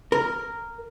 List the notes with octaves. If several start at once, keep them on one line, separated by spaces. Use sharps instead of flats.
A#4